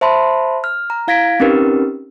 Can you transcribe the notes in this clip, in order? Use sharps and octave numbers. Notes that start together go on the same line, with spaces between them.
C5 E5 A5 B5 C6
F6
A#5
E4 F5 G#6 A#6 B6 D7
C4 C#4 D#4 G4 A#4 B4